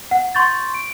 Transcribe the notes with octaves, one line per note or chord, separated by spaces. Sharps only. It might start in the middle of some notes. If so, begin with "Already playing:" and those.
F#5
C6 C#6 G6 A6
D7